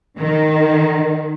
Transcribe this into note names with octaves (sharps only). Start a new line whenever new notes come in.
D#3